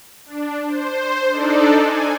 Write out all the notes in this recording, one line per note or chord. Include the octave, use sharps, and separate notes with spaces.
D4
C5
D4 D#4 A4 D5
G#5